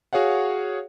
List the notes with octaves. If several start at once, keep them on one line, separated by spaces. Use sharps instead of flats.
F#4 G#4 C#5 F5 F#5